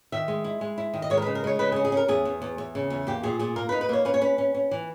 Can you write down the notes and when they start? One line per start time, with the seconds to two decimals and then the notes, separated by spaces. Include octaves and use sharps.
0.12 D#3 E5
0.28 G#3
0.44 E4
0.61 G#3
0.78 E4
0.94 D#3
1.02 D#5
1.10 G#3 C#5
1.17 A#4
1.22 C#3 B4
1.35 A#4
1.44 G#3 C#5
1.59 C#3 B4
1.72 G#4
1.76 C#4
1.85 G#4
1.92 C#4 A#4
2.08 E2 G#4
2.25 E2
2.42 E2
2.58 E2
2.75 C#3
2.90 E2
3.07 A#3 G4
3.23 A#2 G#4
3.39 A#2 G#4
3.56 A#3 A#4
3.69 B4
3.72 D#4
3.81 B4
3.89 A#3 C#5
4.05 C#4 B4
4.14 C#5
4.21 C#4 B4
4.38 C#4
4.54 C#4
4.71 E3